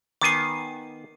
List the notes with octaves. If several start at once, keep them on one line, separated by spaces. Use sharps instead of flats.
D#3 B3 G#5 D6 C7